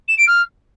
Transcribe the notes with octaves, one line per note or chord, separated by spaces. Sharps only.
E7
D7
F6